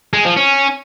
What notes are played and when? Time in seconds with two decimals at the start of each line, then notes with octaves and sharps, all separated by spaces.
0.13 G#3
0.25 F3
0.36 C#4